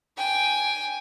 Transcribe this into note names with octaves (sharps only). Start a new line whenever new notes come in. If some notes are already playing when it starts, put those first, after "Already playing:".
G5 G#5